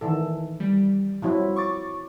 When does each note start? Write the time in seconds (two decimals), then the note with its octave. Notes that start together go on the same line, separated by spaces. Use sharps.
0.01 D#3 E3 A4
0.60 G3
1.22 F3 F#3 E4
1.56 C#6 D6 A6